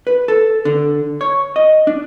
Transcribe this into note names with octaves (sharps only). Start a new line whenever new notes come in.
B4
A4
D3
C#5
D#5
D4